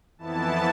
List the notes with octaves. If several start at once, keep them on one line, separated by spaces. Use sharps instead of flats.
F2 E3 B3 E4 A5